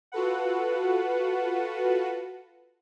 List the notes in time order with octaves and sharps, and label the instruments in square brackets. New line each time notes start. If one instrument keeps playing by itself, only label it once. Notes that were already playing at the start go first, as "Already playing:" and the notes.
[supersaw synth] F4 F#4 A4 B4 F#5